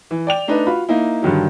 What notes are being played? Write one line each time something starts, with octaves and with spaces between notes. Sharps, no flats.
E3
D5 G5 F7
A3 D4 D#4 B4
F4 F#4 B5
A#3 D#4 E4
G2 D3 D#3 F#3